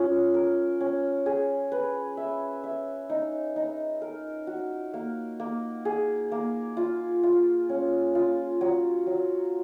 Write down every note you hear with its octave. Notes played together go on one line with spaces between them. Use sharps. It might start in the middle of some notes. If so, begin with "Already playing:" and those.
Already playing: C#4 F4
A#4
C#4
G#4
B4
E5
E5
D#4
D#4
A#4
F#4
A#3
A#3
G#4
A#3
F4
F4
C#4
F4
F#3
F#3